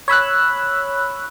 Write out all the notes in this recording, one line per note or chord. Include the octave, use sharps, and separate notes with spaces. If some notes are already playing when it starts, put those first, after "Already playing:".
C#5 B5 E6 F#6